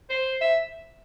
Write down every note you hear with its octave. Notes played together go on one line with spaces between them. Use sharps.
C5
E5